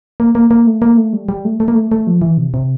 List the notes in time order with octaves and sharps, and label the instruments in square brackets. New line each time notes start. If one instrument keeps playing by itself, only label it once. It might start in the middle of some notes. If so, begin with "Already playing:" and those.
[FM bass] A#3
A#3
A#3
A3
A#3
A3
G3
G3
A3
A3
A#3
A3
A3
F3
E3
C3
C3